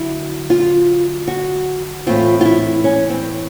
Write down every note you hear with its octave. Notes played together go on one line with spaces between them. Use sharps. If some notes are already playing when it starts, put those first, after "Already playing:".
Already playing: D3 F#3 E4
F4
F#4
A2 E3 A3 C4 F4
F4
E4
C#4
C4